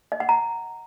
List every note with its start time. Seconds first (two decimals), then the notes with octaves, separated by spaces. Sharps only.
0.12 D#5
0.20 F#5
0.29 A#5